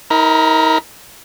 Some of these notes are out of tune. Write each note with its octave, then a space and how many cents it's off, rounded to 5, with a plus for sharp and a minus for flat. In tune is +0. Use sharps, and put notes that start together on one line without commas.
D#4 +45 A#4 +0 B5 +0